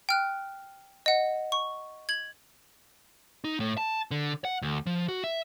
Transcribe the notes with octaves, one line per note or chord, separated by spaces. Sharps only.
G5 F6 F#6
D#5 F#5
C#6
G#6 F#7
D#4
A2
A5
D3
F#5
D2
F3
F#4
E5